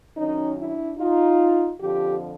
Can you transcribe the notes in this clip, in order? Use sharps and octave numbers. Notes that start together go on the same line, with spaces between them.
F#2 D#3 C#4 D#4
D4 E4
D#4 F4
F2 D3 F3 F4 G4